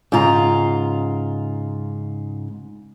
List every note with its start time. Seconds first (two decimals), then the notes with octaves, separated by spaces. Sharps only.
0.12 G#2 C#3 F4 A#5